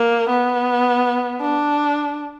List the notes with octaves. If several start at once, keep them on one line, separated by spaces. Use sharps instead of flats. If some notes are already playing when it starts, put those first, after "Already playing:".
Already playing: A#3
B3
D4